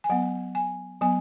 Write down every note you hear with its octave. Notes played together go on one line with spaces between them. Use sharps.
G#5
F#3 B3 F#5
G#5
F#3 B3 G#5